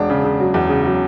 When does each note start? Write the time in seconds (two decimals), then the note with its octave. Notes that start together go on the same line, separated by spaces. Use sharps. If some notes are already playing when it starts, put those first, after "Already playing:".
Already playing: E1 D4
0.10 C#3
0.25 C#3
0.40 F#3
0.54 E2
0.69 C#3
0.85 F#3